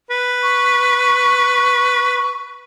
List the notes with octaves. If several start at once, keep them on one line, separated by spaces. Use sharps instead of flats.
B4
C#6